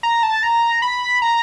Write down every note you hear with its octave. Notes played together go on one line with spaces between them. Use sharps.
A#5
A5
A#5
B5
A#5